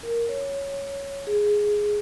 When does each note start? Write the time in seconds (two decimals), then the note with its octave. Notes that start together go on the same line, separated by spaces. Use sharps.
0.03 A#4
0.29 C#5
1.27 G#4